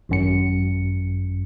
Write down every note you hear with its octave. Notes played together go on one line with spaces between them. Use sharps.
G#1 F#2 C#7